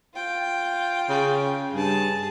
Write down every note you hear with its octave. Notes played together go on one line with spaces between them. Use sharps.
F4 G5
C#3
G2 G#4 A5